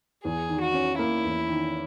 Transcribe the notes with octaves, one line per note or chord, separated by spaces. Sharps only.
E2 G#4
D#3
F#4
C#4
A#3 E4
E2
D#3